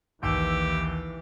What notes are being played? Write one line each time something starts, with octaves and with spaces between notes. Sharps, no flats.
A#1 D#2 E3 G4 E6 D7